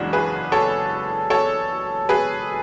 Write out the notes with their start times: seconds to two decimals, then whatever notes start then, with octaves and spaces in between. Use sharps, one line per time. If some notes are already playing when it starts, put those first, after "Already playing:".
Already playing: F#1 E2 C#3 G#3 D4 F#4
0.13 G#4 B4
0.52 A4 C#5
1.30 A4 C#5
2.09 G#4 B4